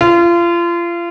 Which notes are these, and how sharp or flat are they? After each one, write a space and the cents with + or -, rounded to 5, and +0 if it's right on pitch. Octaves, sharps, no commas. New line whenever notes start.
F4 -30